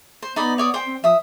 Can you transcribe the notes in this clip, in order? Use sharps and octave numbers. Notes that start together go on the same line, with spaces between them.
C5
B3 D#4 D5 B5
C#5 D5 D#6
C5 G5
C4
F3 E5 D#6